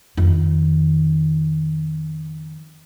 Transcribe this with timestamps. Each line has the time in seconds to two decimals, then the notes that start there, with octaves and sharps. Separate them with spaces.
0.17 F2 D#3